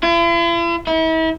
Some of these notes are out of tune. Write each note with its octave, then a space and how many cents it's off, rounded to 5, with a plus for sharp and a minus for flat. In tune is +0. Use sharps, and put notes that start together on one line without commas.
E4 +45
E4 -40